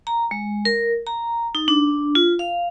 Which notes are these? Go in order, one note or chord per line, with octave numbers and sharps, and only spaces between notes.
A#5
G#3
A#4
A#5
D#4
D4
F4
F5